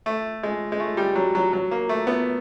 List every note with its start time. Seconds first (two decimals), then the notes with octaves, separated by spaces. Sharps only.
0.06 A3
0.43 G#3
0.72 G#3
0.80 A3
0.97 G3
1.16 F#3
1.35 F#3
1.53 F#3
1.71 A#3
1.89 A3
2.07 B3